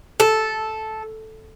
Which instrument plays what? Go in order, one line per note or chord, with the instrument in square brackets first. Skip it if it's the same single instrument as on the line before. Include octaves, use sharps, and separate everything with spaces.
[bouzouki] A4